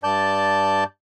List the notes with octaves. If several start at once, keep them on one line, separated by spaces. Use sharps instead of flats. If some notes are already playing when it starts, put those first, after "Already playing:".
G2 D5 A5 G6